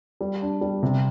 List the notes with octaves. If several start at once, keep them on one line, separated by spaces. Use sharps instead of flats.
G3
D4
G3
C3